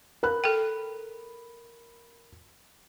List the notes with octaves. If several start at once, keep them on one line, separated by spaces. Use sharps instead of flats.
A#4 B5 F#6
A4 G5